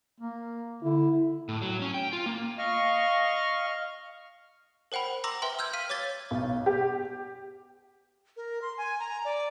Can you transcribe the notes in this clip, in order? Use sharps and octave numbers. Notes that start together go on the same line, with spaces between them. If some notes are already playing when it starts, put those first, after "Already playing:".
A#3
D3 E4
A2
F#3
C#4
G5
F4
A#3
D#5 F5 C#6 F6
A#4 C5 F#5 G5 B5
A#5 C6 D6 E6 A#6 F#7
B4 E5 G5 C6
E6 F6 G6 G#6
F5 F6 B6 D#7
C#5 D6 G#6 A6 G7
B1
G4
A#4
C6
G#5
A#5
D5